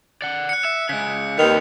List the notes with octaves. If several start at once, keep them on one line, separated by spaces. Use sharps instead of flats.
D5 F#5
F#6 C#7
E5
C#3 G#3 B6
D#2 D#3 G3 C4 B4 F7